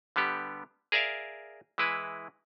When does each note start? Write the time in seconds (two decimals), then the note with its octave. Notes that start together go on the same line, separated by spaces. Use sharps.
0.16 D3 G3 B3 G4
0.92 G#4 A#4 D5 E5 F5
1.78 E3 G#3 E4 B4